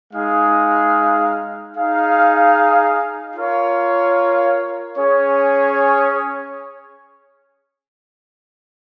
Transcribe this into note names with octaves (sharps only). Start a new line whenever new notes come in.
G#3 D#4 G#4 F5
D#4 G#4 F5
F4 A#4 C#5 F5
C#4 G#4 C#5